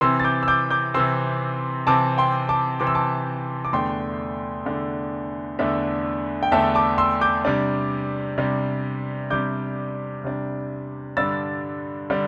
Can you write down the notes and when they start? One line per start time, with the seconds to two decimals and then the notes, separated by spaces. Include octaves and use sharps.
0.01 C3 E3 C4 C6 E6
0.20 A6
0.24 D6 G6
0.43 E6
0.48 D6 G6
0.70 D6 G6
0.94 C3 E3 C4 C6 E6
1.87 C3 E3 C4 A5 D6
2.18 G5 C6
2.49 A5 D6
2.80 C3 E3 C4 D6
2.87 E6
2.95 A5 D6
3.65 D6
3.73 E2 D3 A3 D4 G5 C6
4.66 E2 D3 A3 D4
5.59 E2 D3 A3 D4 E5
6.43 G5
6.51 E2 D3 A3 D4 E5 A5
6.75 A5 D6
6.98 C6 E6
7.21 D6 G6
7.45 C3 G3 D4
8.38 C3 G3 D4
9.30 C3 G3 D4 D6 G6
10.24 C3 G3 D4
11.17 G2 D3 G3 D4 E6 A6
12.10 D3 G3 D4